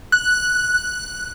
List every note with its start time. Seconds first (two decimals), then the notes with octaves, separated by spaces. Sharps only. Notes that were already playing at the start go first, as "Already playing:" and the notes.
0.12 F#6